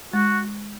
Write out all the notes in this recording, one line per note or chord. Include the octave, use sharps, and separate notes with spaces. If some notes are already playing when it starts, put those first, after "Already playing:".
G#3 F#4